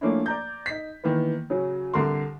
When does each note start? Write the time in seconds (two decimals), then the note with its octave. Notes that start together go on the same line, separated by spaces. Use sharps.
0.01 F3 A3 A#3 C#4 D4 E4
0.26 D5 A#5 G6
0.66 D#4 B6
1.04 D#3 E3 A#3 B3
1.50 C#3 F#3
1.94 C2 D3 A#4 C6